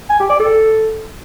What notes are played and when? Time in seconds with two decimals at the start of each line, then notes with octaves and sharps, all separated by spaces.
0.10 G#5
0.20 G4
0.30 D5
0.40 A4